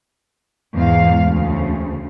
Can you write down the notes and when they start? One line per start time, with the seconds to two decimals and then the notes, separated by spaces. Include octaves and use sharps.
0.75 E2 G#2 F5
1.22 D2 C#3